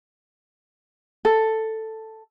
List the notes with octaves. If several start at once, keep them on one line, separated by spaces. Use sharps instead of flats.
A4